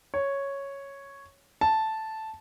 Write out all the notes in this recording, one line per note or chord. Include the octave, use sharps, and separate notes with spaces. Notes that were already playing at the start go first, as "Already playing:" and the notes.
C#5
A5